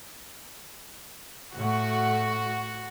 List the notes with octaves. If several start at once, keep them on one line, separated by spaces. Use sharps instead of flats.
A2 A3 F#4